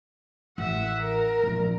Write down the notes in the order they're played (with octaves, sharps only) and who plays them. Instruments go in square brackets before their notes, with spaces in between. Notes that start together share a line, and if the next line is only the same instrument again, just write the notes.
[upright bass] A1 [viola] E5 F#5
[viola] A#4
[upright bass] A#1 F3